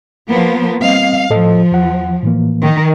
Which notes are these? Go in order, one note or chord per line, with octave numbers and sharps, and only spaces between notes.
F3 A#3 B3
G3 C4 D#5 F5
A2 F3 A4 D#5
E2 F#5
A2 E3 A#3
D#3